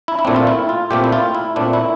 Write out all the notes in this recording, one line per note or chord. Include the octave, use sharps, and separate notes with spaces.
E4
E4
A#2 A3 C4 D4
F4
E4
F4
A#2 A3 C4 G4
E4
F4
E4
A#2 A3 C4 D4
E4